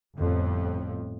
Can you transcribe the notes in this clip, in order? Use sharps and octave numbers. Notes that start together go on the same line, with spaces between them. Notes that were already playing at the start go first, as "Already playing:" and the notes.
G1 F2 A2